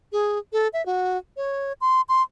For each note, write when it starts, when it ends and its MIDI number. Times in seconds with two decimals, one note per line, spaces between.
0.12 0.38 68
0.52 0.68 69
0.73 0.84 76
0.86 1.17 66
1.37 1.73 73
1.81 2.01 84
2.09 2.22 84